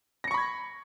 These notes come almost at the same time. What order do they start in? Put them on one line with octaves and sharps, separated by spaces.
A#6 C#7 C#6 B5 G#6